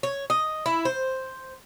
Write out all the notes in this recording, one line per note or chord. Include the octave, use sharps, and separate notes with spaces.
C#5
D#5
E4
C5